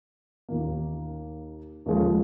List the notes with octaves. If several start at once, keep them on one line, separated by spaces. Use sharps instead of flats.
D#2 D#3 A#3
D#2 C#3 F3 G#3